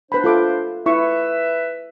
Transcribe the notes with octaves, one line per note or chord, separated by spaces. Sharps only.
D4 B4 C5 B5
F4 A4 D6
E4 B4 E5 C#6